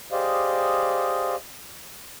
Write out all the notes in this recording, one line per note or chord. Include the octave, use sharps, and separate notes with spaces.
G4 G#4 C5 D5 D#5 F5